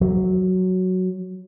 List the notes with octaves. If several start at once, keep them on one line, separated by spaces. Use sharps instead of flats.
F#3